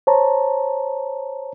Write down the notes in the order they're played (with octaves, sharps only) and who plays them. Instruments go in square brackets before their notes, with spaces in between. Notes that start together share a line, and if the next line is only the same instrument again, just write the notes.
[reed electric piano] C5 C#5 A5 A#5